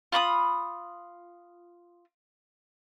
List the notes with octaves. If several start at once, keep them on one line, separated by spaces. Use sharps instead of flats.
F4 B5 C#6 D#6